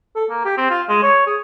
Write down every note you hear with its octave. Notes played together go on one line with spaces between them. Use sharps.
A4
A#3
G4
C4
F4
G#3
C#5
G#4